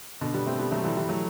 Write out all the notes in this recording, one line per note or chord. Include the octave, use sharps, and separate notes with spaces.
B2 D3
G3 B3
A3 C4
G3 B3
F#3 A3
E3 G3
E3 G3
F#3 A3